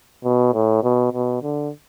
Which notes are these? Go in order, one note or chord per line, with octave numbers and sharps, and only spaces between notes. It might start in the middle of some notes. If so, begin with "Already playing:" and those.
B2
A2
B2
B2
D3